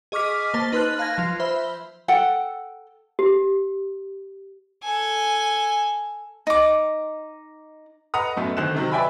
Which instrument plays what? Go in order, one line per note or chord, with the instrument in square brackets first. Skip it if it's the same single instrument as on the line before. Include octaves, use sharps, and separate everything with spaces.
[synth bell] G#4 D#5 C#6 D6 F6 B6
A#3 C5 A5 A6
D#4 B4 C6 F6 F#6
F5 A5 F#6 G#6 A#6
F3 F4
C5 E5 B5
[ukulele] A4 F#5 G5
[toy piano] G4
[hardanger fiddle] A4 G#5
[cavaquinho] D#4 D6
[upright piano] B4 D#5 F#5 A#5 D#6
F#2 B2 A3 B3
G#1 D3 D#3 C5 F#6 E7
C3 D#3 F#3
B4 D5 E5 G5 G#5 B5